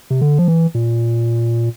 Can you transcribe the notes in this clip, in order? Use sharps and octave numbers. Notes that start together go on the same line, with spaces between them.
C3
D3
F3
E3
A#2